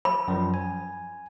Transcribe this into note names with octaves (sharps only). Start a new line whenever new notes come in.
B5
F#2 F3
G#5